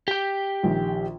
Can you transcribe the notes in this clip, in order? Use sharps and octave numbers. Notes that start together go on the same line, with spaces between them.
G4 G5
A#1 D#3